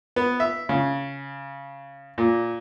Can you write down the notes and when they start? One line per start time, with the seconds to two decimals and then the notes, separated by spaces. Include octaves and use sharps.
0.16 B3
0.40 E5
0.69 C#3
2.18 A#2